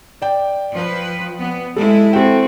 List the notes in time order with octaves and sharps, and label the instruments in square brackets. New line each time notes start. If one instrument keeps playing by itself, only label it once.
[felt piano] D5 G5
[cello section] F3 B4
B3
[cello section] G#3 E4 [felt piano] A4
[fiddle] C4 F#4 [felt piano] A4 G5